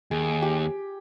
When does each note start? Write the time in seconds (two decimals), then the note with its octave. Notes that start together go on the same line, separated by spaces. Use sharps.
0.11 D#2 G#4
0.42 G4